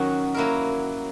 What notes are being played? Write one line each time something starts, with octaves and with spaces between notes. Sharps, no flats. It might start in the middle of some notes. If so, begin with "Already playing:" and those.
Already playing: D#3 F#3 C#4 F#4
F#3 A#3 E4 A#4